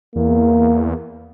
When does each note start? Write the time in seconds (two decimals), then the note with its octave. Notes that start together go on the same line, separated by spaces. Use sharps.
0.16 E2 A#3